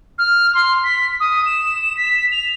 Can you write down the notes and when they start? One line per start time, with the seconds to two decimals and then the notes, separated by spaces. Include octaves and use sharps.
0.18 F6
0.55 C6
0.84 B6
1.20 D#6
1.46 E7
1.97 B6
2.32 F7